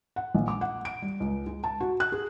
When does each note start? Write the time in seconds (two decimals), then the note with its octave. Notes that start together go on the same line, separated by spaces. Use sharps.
0.16 F#5
0.35 A#1
0.48 D6
0.61 F#5
0.85 D7
1.02 G3
1.20 C#2
1.46 G#3
1.64 A5
1.80 F#4
2.00 F#6
2.12 G#4